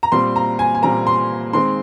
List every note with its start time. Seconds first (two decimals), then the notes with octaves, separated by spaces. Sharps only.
0.03 A#5
0.12 A#2 G3 C4 C6
0.36 A#5
0.59 G#5
0.75 G#5
0.82 A#2 G3 C4 A#5
1.07 C6
1.53 D#3 G#3 C4 C6